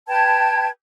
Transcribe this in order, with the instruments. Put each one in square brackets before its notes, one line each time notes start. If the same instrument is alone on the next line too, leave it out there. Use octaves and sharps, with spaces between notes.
[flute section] B4 G5 A5 G#6